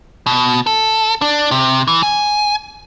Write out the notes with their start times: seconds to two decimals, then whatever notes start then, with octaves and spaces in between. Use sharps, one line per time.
0.26 B2
0.66 A4
1.22 D4
1.51 C3
1.88 E3
2.03 G#5